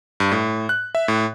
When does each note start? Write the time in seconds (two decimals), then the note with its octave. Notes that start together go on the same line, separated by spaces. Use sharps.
0.20 G2
0.32 A2
0.69 F#6
0.95 E5
1.08 A2